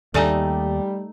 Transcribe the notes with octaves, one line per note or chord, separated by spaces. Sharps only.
D#2 G3 A3 D#4 A4 D5 G#5